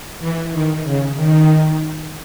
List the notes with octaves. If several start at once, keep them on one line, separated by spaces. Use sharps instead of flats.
E3
D#3
C#3
D#3